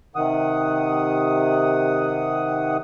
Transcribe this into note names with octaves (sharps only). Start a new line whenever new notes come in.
C3 D#3 F#5 D#6